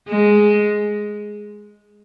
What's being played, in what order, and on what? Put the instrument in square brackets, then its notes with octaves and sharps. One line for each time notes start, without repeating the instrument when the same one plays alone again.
[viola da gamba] G#3